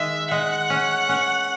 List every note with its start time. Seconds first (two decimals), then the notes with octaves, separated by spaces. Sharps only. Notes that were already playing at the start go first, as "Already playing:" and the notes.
Already playing: D#3 G#3 E5
0.31 G#3 F#5
0.70 C#4
1.09 C#4